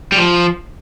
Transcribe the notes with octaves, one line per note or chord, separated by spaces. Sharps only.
G3
F3